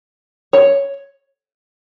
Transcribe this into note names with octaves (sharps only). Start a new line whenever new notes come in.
C#5